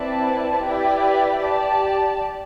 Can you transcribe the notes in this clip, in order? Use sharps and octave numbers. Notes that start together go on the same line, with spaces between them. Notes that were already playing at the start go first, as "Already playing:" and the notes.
Already playing: C4 E4 B4 D5 A5
E4 G4 B4 D5 G5
G4 D5 A5